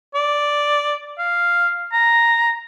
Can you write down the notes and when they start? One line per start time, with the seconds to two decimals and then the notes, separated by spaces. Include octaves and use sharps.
0.15 D5
1.19 F5
1.93 A#5